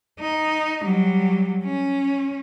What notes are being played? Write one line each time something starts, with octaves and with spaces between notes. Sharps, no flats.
D#4
F#3 G3
C#4